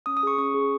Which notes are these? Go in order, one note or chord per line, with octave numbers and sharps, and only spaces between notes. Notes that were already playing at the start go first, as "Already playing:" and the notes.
C#4 D#6
D#6
G#4 C#6
C#4 C#6
G#4